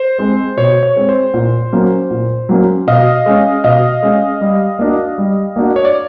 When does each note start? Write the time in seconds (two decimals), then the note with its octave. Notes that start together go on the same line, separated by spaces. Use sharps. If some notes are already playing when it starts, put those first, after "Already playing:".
Already playing: C5
0.18 G#3 C4
0.57 B2 C#5
0.83 C#5
0.96 G#3 C4
1.09 C5
1.34 A#2
1.72 F#3 A#3 C#4
2.10 A#2
2.49 F#3 A#3 C#4
2.87 B2 D#5 F5
3.26 G#3 C#4
3.64 B2 D#5 F5
4.03 G#3 C#4
4.41 G3
4.79 A#3 D4 F#4
5.18 G3
5.56 A#3 D4 F#4
5.76 C#5
5.85 D5